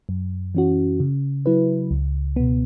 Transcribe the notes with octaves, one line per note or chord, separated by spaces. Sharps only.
F#2
E3 C#4 F#4
C#3
F#3 E4 B4
C#2
B2 B3